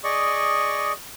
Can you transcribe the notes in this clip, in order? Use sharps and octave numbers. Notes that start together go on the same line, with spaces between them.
G#4 D5 D#5 C#6